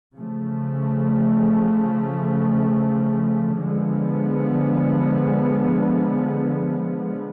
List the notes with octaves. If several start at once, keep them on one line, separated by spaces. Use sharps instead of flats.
C#3 F3 A3
D3 F3 G#3 B3